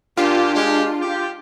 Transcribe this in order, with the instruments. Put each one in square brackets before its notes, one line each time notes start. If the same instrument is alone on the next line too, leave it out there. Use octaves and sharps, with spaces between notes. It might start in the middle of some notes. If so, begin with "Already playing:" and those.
[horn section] A#2 G4 [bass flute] D4 [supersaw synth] F4
[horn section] G#3 G4
G4